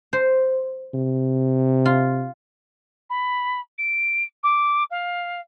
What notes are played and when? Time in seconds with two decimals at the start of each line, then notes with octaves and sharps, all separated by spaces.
0.13 C5
0.94 C3
1.85 F4
3.10 B5
3.78 D7
4.43 D6
4.91 F5